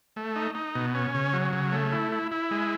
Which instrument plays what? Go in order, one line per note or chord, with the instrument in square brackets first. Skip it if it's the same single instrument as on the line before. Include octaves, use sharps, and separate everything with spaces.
[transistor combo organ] A3
D#4
D#4
B2
C#4
C#3
F#3
C#3
A3
E4
E4
E4
G#3